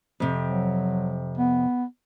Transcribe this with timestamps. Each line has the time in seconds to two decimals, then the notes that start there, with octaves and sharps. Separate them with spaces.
0.20 F2 C3
0.48 F#3
1.37 B3